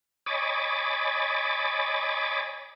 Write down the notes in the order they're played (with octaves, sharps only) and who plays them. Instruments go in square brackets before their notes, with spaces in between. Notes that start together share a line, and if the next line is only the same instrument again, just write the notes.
[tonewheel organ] C#5 D#5 G#5 B5 D6 A6